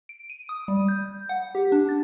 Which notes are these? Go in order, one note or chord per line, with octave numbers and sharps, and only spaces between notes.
D7
D#7
D#6
G3
G6
F#5
G4
D4
A6